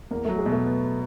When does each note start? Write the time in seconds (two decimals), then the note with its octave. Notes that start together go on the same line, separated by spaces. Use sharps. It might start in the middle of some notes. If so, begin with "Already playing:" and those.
0.11 E2 A#3
0.25 F#3 A3
0.38 G#3
0.46 B2
0.52 A3
0.64 B3